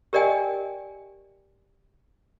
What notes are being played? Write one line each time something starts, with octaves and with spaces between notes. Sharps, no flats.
G4 A#4 D5 D#5 G5 G#5